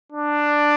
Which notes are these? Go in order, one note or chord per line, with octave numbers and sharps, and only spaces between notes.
D4